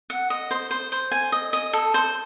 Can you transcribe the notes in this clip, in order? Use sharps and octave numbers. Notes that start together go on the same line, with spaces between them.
F#5
D#5
C5
C5
C5
G#5
D#5
D#5
A4
C5